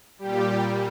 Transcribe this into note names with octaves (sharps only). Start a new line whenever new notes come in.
A#2 G3 G4